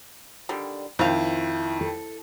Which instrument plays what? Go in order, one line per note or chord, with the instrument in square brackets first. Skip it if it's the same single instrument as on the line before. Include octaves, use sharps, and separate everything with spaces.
[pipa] D3 D#3 G3
[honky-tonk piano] F2 D#3 [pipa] C4 F5 [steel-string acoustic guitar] E4
[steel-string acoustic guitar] A4